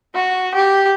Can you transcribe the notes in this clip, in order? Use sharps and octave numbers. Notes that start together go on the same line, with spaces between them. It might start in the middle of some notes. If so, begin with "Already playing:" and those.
F#4
G4